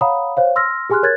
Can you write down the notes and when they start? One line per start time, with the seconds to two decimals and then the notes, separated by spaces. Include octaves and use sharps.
0.01 C#5 F5 F#5 A#5 B5 D#6
0.37 C5 C#5 F5
0.56 C6 E6 F6 A#6
0.90 G4 G#4 G#5 C6 F6 F#6
1.03 A#4 C#5 F#6 G#6 A6